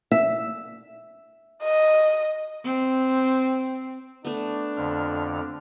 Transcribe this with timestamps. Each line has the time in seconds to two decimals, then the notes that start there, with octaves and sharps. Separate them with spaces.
0.12 E5
1.63 D#5
2.64 C4
4.25 A3 B3 D4
4.77 F2 D3 F6